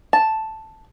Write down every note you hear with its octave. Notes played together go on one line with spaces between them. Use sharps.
A5